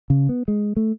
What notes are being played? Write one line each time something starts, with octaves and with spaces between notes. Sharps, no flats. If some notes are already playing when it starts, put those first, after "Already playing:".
C#3
B3
G#3
A3